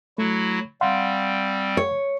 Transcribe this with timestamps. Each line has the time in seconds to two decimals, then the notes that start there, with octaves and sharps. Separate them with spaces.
0.18 F#3 A3 E4 F#4
0.81 G3 C4 F5 F#5 C6
1.77 C#5